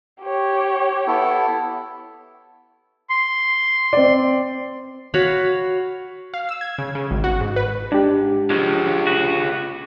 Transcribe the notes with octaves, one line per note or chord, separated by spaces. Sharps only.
G4 C#5
B3 E4 A4
C6
C4 D5
F#4 C#5 F5 B5
F5
E6
G#6
C#3
C#3
G#1
F#4
G#2
B4
G#2 D4 G4
F3 F#3 G#3 F4 G#4
C#3 B3 F#4